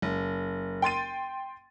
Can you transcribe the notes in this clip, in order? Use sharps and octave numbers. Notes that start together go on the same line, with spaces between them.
F#1
G5 C6 A6 D#7